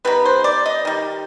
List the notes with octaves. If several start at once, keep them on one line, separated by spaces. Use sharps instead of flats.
D#3 G3 B3 B4
C5
D5
D#5
D#3 G3